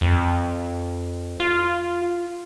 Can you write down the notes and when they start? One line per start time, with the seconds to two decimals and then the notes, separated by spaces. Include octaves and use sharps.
0.01 F2
1.40 F4